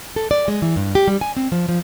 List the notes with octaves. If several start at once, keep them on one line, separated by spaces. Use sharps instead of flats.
A4
D5
G#3
E3
G2
G4
G3
G#5
C4
F3
F3